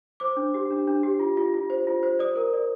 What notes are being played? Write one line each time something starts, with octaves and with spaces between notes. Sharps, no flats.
C5 D6
D4
G4
D4
D4
G4
F4
F4
F4
C5
F4
C5
D5 D#6
A#4
D5